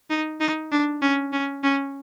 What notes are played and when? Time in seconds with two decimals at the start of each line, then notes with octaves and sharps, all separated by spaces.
0.10 D#4
0.40 D#4
0.72 D4
1.02 C#4
1.32 C#4
1.63 C#4